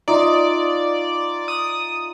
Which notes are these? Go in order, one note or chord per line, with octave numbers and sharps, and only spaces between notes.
D#4 F4 D5 E5
D#6